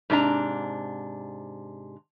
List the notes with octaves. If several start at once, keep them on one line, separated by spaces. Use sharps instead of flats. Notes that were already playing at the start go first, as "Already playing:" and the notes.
G#2 C3 D4 A#5